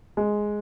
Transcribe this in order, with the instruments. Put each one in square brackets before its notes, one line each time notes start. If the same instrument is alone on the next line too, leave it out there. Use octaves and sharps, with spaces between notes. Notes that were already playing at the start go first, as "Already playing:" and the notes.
[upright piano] G#3